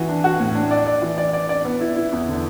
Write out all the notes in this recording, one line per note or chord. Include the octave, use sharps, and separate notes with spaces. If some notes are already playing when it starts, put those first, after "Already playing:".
Already playing: E3 F#4
D4
F#4
A2
D4
D5
D5
E3
D5
D5
D5
B3
E4
E4
E2
D3